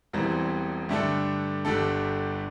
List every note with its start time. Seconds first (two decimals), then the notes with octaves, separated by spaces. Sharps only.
0.13 E1 E2 E3 G3 C4
0.89 G2 D3 A3 D4 A4
1.65 G1 G2 G3 D4 A4